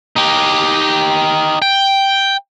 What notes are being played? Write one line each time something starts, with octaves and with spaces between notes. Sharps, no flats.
D#4 G4
G5